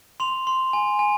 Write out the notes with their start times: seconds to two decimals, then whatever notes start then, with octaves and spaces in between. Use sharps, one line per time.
0.20 C6 F7
0.47 C6
0.73 G#5
0.99 G#5